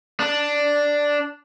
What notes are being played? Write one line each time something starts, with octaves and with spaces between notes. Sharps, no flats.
D4